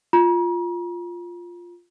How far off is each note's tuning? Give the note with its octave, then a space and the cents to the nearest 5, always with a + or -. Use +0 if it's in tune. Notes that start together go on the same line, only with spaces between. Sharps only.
F4 +0 A#5 +40